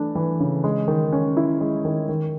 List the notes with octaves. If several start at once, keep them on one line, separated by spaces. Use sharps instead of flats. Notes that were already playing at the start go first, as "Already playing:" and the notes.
Already playing: E3 A3 D4
E3
C#3
G#3
D#3
C#4
E4
G#3
D#3
D#3